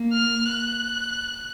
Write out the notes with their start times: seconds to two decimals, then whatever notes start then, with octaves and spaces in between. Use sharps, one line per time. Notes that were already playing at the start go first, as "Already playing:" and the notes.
Already playing: A#3
0.13 F6
0.45 F#6